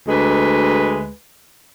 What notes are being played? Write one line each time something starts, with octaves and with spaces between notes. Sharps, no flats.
D2 G#3 B4